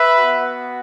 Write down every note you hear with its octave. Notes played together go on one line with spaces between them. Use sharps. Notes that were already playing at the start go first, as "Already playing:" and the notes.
Already playing: B4 E5
B3 F#4